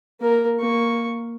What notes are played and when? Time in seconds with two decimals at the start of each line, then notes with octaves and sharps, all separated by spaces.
0.21 A#3 A#4
0.60 A#3 C#6